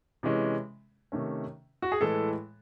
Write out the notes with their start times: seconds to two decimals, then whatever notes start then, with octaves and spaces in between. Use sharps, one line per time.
0.23 C3 E3 G#3 C#4
1.12 C3 D#3 A3 C#4
1.82 F#4
1.92 G#4
2.01 A2 E3 G#3 A4